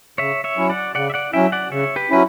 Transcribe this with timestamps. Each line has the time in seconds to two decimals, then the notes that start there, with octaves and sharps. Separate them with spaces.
0.18 C#3 C#5 E5
0.44 C#5 E5
0.57 F#3 C#4 E4
0.70 D5 F#5
0.95 C#3 D5 F#5
1.10 E5
1.14 D5 F#5
1.33 F#3 C#4 E4 E5 G5
1.52 D5 F#5
1.71 C#3 C#5 E5
1.96 G4 B4
2.10 F#3 C#4 E4 B4